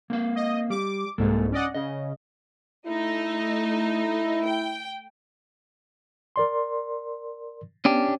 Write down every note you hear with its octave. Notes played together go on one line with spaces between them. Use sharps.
A#3 C4 F5
D#5
G3 D6
C2 G#2 G#3 A#3 A4
C#4 D5 D#5 F#5
C#3 D#5
A3 D#4 E4
G5
A#4 D5 C6
B3 C#4 D4 G4